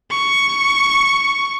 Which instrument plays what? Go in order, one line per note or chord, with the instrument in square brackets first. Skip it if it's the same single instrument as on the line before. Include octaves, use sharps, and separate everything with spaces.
[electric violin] C#6